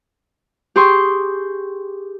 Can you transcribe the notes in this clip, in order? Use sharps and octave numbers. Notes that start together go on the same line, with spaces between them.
G4 G#4 C6 C#6